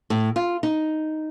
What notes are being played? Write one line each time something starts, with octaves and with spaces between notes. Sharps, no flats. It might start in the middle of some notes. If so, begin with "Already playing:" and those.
A2
F4
D#4